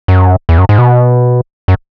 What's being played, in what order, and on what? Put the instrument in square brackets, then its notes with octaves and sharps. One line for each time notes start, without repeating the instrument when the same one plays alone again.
[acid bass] F#2
E2
F#2
G#2
B2
F#2